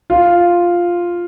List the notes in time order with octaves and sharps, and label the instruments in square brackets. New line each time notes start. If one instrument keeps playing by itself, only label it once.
[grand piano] F4